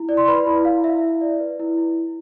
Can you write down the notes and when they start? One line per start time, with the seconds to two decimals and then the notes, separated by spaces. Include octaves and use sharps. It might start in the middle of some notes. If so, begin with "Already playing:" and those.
Already playing: E4
0.09 D5
0.17 C6
0.28 B4 B5
0.46 E4
0.65 E4 F5
0.84 E4 E5
1.03 E4
1.21 D5
1.40 B4
1.60 E4
1.78 E4
1.97 E4